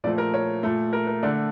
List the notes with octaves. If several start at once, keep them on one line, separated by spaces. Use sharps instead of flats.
A#2 F3 A3 D5
A#4
C#5
A#2 A3
A#4
A#4
D3 A3 D5